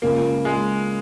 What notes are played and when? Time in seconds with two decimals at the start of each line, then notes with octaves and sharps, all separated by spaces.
0.02 C#2 C#3 F3 A#3
0.45 G#3